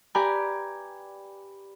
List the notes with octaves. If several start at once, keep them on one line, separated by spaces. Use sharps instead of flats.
G4 B4 D5 G5 G#5 A#5